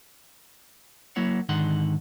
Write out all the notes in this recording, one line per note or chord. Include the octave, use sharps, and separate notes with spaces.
F#3 A#3 E4 C#5 F#5
G#2 D3 D#3 D#4 F#5 C6